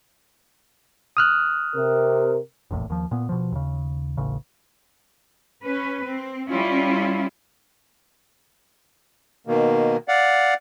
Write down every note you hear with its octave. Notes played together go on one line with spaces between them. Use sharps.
D#6 F6 F#6
C3 A#4
F1 A#1 E2 A2
D#2 F3
A#2 B3
B2 F3
D#2 C#3
D#1 A1 C#3
C#4 B4
C4
G3 C#4 E4 F4
B2 D#3 A#3
D5 F5 F#5